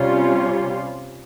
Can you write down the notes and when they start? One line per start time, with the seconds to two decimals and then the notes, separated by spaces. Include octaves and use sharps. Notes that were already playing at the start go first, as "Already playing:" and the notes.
Already playing: C3 G3 C#4 F4